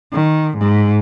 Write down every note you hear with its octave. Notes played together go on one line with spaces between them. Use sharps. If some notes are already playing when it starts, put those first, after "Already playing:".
D#3
G#2